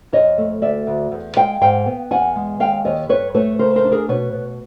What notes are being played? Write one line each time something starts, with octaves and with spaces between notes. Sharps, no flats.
F2 C#5 D#5
A3
D2 D5 E5
D2
E2
G#3 F5 G5
G#2 F5 G5
B3
E2 F#5 G#5
G#3
D#2 F5 G5
D#2 C#5 D#5
G2 B4 C#5
A3 B4 C#5
C#3 A#4 C5
A#4 C5
D4
G#4 A#4
B2 B4 C#5
B2